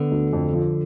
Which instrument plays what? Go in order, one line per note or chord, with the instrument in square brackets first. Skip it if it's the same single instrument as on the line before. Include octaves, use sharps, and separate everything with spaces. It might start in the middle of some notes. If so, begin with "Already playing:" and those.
Already playing: [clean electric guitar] D3 [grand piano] B3
[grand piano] D2
F2
F3